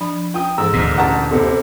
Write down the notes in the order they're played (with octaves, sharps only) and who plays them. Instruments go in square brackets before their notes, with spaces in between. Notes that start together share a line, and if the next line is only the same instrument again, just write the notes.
[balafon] F3 D4 B5
[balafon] C#4 F4 [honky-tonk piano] G5 D#6
[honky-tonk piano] G#2 [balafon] E3 A4 C5 [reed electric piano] A#5 E6
[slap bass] D2 A#2
[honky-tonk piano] A1 A5 A#5 [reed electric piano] F#5
[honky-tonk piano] F#1 C3 [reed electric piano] A4